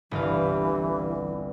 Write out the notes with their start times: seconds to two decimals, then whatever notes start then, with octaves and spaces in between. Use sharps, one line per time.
0.11 G1 C2 E3 F5